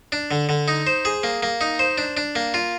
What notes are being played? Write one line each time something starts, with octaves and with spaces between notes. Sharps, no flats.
D4
D3
D3
D#4
C5
G#4
A#3
A#3
D#4
C5
D4
D4
A#3
F4